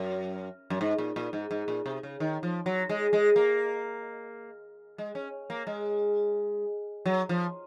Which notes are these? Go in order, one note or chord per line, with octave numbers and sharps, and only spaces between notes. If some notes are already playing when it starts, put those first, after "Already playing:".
Already playing: F#2
F#2
G#2
A#2
A#2
G#2
G#2
A#2
C3
C#3
D#3
F3
F#3
G#3
G#3
A#3
G#3
C#4
A#3
G#3
F#3
F3